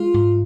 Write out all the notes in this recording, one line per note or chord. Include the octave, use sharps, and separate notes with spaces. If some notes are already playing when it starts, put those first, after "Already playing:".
Already playing: G#3 F4
G#2